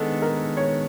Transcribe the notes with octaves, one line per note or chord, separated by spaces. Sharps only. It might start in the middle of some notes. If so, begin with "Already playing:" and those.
Already playing: D#3 G#3 B3 D4 A4
A#4
C#5